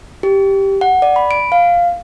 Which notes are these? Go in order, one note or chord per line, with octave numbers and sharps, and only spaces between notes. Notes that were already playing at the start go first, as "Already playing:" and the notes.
G4
F#5
D5
B5
D7
F5